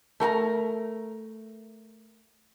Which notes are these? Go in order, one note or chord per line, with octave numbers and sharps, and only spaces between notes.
A3 A#4 G5 A#5